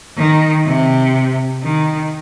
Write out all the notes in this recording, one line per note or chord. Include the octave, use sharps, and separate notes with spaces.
D#3
C3
D#3